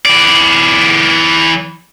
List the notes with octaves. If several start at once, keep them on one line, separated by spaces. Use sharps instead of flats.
E3 D5